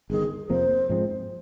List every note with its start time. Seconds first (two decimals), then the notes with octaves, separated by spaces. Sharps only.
0.10 G1 G2 D#3 G#4
0.50 F2 C3 F3 A#3 C5
0.89 G#2 F3 G#3 C4